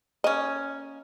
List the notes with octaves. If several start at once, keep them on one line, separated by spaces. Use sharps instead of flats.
A#3 C#4 D#5